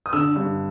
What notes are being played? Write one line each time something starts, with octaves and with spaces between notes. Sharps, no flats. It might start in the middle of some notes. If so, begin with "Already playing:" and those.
D#6
D3 E6
G2